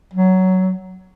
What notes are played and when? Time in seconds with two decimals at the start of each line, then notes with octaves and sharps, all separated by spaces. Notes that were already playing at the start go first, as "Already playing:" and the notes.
0.14 F#3